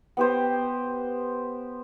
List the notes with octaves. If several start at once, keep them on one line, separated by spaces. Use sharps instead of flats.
B3 G4 C5